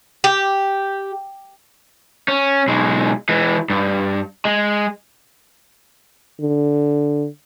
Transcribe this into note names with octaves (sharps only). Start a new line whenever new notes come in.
G4
C#4
B1 G#3
E3 G#3
G2
G#3
D3